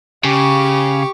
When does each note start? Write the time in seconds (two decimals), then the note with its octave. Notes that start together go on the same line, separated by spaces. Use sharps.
0.24 C#3 G4 C#6